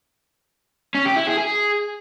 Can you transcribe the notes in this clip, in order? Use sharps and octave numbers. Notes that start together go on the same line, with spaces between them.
C#4
G4
E4
G#4
G#4